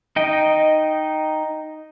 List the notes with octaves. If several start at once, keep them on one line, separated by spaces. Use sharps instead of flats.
D#4 D#5 G5